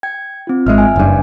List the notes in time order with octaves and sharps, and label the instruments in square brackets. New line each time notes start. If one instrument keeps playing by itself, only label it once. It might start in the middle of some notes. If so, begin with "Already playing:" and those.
[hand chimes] G5 G#6
C4 F4
[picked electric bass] G#1 G#3 [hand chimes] E5 F6
[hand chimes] G#5
[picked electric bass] F#1 G2